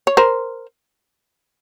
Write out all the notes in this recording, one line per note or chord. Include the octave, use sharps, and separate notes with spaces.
C#5
A#4 C5